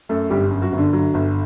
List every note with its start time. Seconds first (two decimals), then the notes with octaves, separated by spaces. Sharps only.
0.09 F#2 A3 A4
0.30 G1 G3 G4
0.51 F#2
0.61 F#3 F#4
0.72 G1
0.78 D3 D4
0.93 F#3
1.14 G1